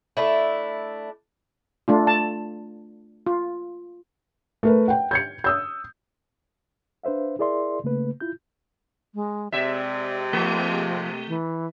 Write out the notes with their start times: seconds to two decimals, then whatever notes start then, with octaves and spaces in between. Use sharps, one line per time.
0.17 A3 D4 E4
1.88 A3 D4 F4
2.07 A5
3.27 F4
4.63 A3 A#4 B4
4.88 F#5 G5
5.11 G6 G#6 C#7
5.44 D#6 E6 G6
7.04 D4 B4 C5 E5 F5
7.39 E4 G#4 A#4 D5 E5 C6
7.84 C#3 A3 A#3 B4
8.20 E4 F4 G6
9.15 G#3
9.52 C3 G#3 D5 E5
10.33 F3 A3
11.28 E3